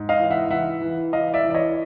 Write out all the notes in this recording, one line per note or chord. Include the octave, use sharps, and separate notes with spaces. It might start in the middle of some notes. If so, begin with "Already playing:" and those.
Already playing: G#2
D#5 F5
E3
E5 F#5
E3 E5 F#5
E3
E3 D#5 F5
D5 E5
E3
D5
C#5 D#5